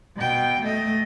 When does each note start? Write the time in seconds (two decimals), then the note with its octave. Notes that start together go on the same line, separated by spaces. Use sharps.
0.16 B2 G5
0.62 A3 D#5